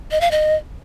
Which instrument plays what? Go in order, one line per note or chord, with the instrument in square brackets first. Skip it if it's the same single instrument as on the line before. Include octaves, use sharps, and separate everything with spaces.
[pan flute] D#5
F5
D#5